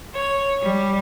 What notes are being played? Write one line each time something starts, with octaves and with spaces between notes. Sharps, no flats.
C#5
G3